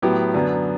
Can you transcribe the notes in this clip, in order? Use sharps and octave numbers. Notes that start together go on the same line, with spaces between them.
A2 F#3 B3 E4 G4
F#2 D3 F#3 B3